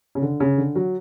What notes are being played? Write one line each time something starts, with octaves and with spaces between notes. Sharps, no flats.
C#3
D3
C#3
D3
F#3